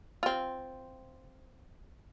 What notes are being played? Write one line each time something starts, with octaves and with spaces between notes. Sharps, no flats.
C4 F4